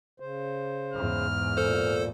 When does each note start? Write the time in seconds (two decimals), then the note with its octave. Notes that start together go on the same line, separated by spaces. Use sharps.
0.20 C#3 C5
0.93 E2 G#2 F6
1.57 A#2 A4 C5